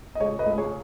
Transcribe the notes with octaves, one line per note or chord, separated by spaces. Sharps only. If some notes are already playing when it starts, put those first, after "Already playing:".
D#5
C#2 G#4 C#5
B4 D#5
C#2
G#4 C#5